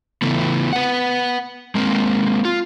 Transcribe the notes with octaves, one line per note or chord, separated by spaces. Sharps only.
C#3 E3 A3 B3
B4 F#5
G#3 A#3 C4
F4